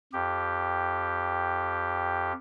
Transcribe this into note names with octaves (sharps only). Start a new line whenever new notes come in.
F2 G4